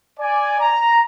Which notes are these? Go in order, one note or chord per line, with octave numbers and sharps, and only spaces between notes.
D5 G#5
A#5